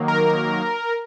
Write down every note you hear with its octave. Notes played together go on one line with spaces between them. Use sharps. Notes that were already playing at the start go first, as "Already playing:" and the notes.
Already playing: D#3 F#3 A#3
A#4